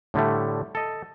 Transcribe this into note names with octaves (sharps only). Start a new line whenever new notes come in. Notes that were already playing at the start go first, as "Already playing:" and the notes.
A2 D3 G3 A3
A4 D#5